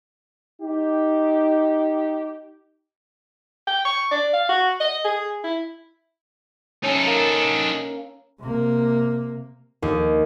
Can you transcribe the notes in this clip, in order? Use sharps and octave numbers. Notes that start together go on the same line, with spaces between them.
D#4 G4
G5
C#6
D5
F5
F#4
D#5
G#4
E4
C#4 D#4 A4 E5
A#3
C3 A#3
D#2